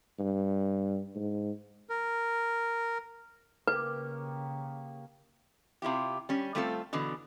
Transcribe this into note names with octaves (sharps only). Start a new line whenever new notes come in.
G2
G#2
A#4
C#3 A#3 G4 B4
C3 E4 F4 G4
G3 C#4
G3 A3 C4 F4 A4
B2 D3 E3